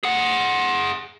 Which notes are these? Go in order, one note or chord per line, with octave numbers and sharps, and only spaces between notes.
G#4 F#5